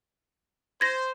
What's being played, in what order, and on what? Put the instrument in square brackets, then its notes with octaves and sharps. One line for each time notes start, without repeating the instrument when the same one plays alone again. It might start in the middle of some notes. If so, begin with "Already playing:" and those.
[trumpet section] C5 [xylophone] G#6 A#6